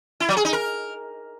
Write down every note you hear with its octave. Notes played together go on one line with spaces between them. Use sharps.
E4
F#3
G#4
D#4
A#4